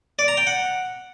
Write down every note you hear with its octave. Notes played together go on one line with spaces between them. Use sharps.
D5
A#5
G5
F#5